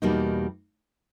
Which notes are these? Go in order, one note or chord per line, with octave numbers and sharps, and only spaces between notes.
E2 B2 G3 A#3 D#4